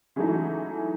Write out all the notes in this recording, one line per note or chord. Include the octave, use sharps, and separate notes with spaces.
C#3 E3 F#3 G#3 A3 D#4